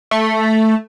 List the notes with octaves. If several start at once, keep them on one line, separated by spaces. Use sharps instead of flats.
A3